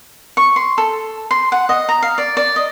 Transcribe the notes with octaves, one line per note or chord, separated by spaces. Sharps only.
C#6
C6
A4
C6
F#5
D#5
A#5
F5
D5
D5
D#5